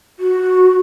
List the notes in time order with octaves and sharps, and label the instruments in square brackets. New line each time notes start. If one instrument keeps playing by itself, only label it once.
[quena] F#4